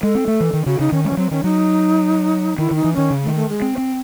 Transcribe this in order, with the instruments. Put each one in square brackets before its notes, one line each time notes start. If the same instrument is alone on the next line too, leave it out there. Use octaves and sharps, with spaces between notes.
[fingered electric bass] G#3 [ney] A4
[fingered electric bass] C4
A3
E3
D#3
[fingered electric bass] C#3 [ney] F#4
[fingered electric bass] C#3 [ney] D#4
[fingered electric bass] D#3 [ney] C#4
[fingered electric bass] G#3 [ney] C#4
[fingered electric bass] E3
[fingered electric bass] F#3 [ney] C4
[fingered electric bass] D#3 [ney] C#4
[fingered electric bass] F#3 [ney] D#4
[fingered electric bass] D#3 [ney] E4
[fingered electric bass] D#3 [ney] D#4
[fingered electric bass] E3
[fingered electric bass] D#3 [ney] C#4
[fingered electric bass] C#3
[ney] A3
[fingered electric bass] D#3
[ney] A3
G#3
[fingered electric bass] C4
C4